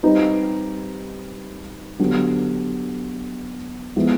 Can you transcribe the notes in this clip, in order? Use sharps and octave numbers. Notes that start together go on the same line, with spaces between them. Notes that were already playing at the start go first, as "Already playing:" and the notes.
G3 C4 D#4 G4 B4
D3 F#3 B3 D4 G4
F3 G#3 B3 E4